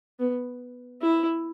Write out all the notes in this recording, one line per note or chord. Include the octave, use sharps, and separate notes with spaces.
B3
E4